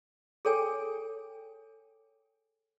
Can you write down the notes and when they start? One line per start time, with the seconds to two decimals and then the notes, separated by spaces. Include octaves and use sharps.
0.45 G#4 A4 C#5 G5 G#5